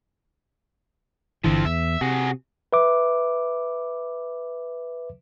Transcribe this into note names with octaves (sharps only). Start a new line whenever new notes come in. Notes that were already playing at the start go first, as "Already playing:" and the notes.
G1 D3 E3 F3 C4
E2 E5
C3 F#4 G#4
B4 E5 D6